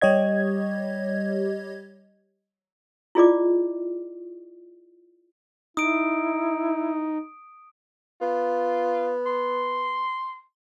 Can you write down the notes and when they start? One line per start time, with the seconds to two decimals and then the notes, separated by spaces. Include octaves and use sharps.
0.02 G3 G4 C#5 D#5 G#6
3.15 E4 F4 G#4 D5 D#5 D6
5.77 D#4 E4 D#6 D7
8.21 B3 F4
9.26 C6